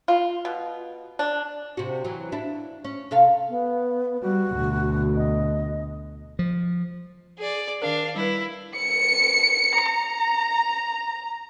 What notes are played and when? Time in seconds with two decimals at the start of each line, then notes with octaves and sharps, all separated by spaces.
0.08 F4
0.45 B2
1.19 D4
1.77 C3 F#4
2.04 E3 F#3
2.32 D4 E4
2.84 C#4
3.11 C3 A4 F5
3.49 B3
4.22 G3 F#4
4.53 D2 B2
5.16 D#5
6.39 F3
7.38 G#4 D5
7.82 D#3 D4 A#4 F5
8.16 G3 E4 B4
8.77 C#7
9.88 A#5